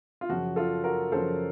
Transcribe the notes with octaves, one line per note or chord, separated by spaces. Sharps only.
F4
F#2 C#3 F3 F#4
F4 A4
F#4 A#4
F#2 C#3 F3 A4 C5